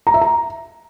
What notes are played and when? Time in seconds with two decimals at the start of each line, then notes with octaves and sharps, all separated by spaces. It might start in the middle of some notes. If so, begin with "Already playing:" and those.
0.07 A#5
0.14 E5
0.22 A#5